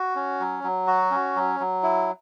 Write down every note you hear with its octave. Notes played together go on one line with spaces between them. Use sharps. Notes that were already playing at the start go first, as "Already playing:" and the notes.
Already playing: F#4
C#4
F#3
F#3
F#4
C#4
F#3
F#3
E4